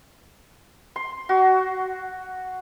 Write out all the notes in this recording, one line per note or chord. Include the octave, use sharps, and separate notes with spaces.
C6
F#4